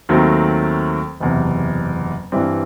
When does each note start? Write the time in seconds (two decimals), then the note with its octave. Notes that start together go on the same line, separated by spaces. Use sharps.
0.09 D#2 D#3 F#3 A3 C4
1.20 F#1 E2 C3
2.32 G2 E3 G3 C4